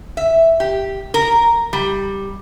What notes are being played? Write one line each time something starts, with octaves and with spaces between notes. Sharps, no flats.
E5
G4
A#4
G3